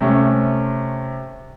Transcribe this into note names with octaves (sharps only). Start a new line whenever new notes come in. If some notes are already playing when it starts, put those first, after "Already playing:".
C3 A3 C#4